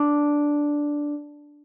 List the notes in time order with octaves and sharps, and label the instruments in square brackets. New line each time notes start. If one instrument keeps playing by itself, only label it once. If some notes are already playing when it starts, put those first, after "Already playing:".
Already playing: [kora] D4